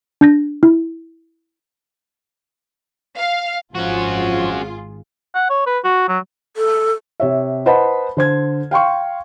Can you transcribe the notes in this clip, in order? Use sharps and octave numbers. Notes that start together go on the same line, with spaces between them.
D4 G6 A#6
E4
F5
G#1 F3 C#4 F4 F#4 G#4
F#5
C#5
B4
F#4
F#3
A4
C3 C#5 E5
B4 C5 D#5 F#5 A5 B5
D3 C5 G#6
F5 G5 C6 C#6